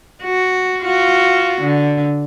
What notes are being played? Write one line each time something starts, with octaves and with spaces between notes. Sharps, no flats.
F#4
F4 F#4
D3